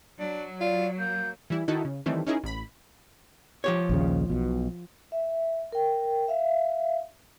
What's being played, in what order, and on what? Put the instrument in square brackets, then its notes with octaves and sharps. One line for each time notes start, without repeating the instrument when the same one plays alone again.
[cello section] F#3 [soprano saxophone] D4
[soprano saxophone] F4 [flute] D5
[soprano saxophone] A#3 [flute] G6
[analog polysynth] E3 G3 E4
D#3 D#4 E4 F#4 A4
C#3
D#3 E3 G3 A3 C4
C#4 D#4 E4 G#4 A#4
A1 B5
[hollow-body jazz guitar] F3 G4 C#5
[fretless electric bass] A#1 D#2 C#3
B1 B2
[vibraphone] E5
A#4 G5
E5 F5